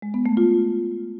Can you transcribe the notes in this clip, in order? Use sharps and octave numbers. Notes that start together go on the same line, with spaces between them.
G#3
B3
A3
F4